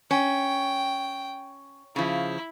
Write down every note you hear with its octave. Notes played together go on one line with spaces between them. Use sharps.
C#4 G5
C#3 F3 E4